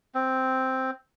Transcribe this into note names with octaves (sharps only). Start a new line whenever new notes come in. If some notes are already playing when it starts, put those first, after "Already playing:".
C4